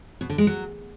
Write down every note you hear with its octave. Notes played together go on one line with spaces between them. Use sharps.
B2
D3
G#3
F#3